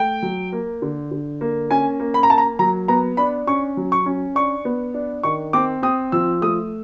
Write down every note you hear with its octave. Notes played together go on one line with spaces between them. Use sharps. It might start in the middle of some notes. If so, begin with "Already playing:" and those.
Already playing: A3 G5
F#3
A#3
D3
D3
A#3
C#4 G#5
A#3
B5
A#5
A#3 A5
A#5
F#3 A#5
B3 A#5
D4 B5
C#4 C#6
F#3
C#6
C#4
D4 C#6
B3
D4
D#3 C#6
C4 D6
C4 D#6
F3 E6
A3 D#6